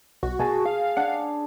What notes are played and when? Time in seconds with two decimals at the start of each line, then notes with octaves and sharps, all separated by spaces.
0.23 B1 F#4
0.39 B2 G#4 G#5 A5
0.66 F5
0.97 D4 F#5